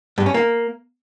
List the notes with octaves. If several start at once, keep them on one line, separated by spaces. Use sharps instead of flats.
G2
C#4
A#3